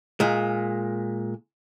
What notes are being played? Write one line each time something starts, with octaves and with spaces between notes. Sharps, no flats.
A#2 G#3